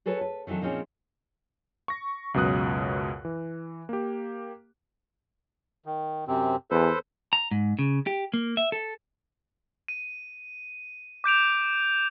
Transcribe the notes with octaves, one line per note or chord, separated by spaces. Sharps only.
F#4 G#4 A4 B4 C#5
B4
D#3 E3 F#3 C4 A4
A#2 F3 C4 C#4 D#4 G#4
C#6 A#6
C#2 F#2 B2 F#3 D#6 F#6
E3
A#3 G4
D#3
F#2 C3 C4
E2 A4 B4 C5
A#5
G#2
C#3
G4
A#3
E5
A4
D#7
D6 G6 D7 F7